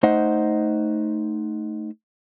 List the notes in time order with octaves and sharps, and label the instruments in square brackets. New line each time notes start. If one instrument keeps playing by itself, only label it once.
[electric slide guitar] A3 D#4 C5 D#5 F#5